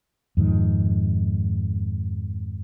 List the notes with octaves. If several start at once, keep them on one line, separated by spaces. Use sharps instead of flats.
F2 G#2 D#3